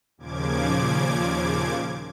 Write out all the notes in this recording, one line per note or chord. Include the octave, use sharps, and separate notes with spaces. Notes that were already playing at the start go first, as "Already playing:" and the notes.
D#2 A#2 C#3 F3 D6 G#6